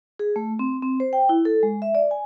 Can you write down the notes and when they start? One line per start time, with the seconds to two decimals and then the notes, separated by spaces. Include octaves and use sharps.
0.19 G#4
0.36 A3
0.59 C4
0.82 C4
1.00 C5
1.13 G5
1.29 E4
1.45 A4
1.63 G#3
1.82 E5
1.95 D5
2.11 G#5